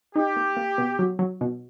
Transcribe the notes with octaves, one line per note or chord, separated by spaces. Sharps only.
D#4 G4
A#3
A#3
B2
F#3
F#3
B2